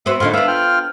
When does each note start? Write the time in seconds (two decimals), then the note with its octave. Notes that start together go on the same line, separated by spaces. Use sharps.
0.06 B3 C4 F#4 E5
0.20 A2 D3 D#4 F4 C6
0.34 B3 D4 E5 F5
0.48 F4 G5 F6